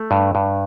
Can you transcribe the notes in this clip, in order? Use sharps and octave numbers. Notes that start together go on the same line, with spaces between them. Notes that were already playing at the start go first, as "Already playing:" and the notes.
Already playing: A3
G2
G2